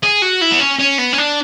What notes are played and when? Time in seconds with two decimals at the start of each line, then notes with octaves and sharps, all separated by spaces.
0.03 G#4
0.22 F#4
0.42 E4
0.52 B3
0.60 C#4
0.79 C#4
0.99 B3
1.13 C#4
1.18 D4